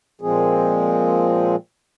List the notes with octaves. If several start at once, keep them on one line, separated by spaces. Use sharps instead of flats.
A#2 F3 G#3 C4 G#4